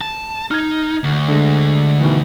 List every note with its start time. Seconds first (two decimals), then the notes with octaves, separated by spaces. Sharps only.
0.01 A5
0.51 D#4 F6 G#6
1.04 D2
1.28 D3 G#3
2.01 B2 D#3 E3